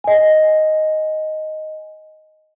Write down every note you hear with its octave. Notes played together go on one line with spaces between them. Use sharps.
D#5 G#5